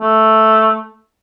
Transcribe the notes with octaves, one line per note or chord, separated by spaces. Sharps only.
A3